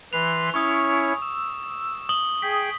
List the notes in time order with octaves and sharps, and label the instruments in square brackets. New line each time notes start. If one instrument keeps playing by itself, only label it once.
[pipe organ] E3 B4 C6 [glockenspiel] F7
[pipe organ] C#4 E4 C#5 [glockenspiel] C#6 D#6
[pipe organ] E6
[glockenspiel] D#6 F#7 G7
[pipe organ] G#4 G5 [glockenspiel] B6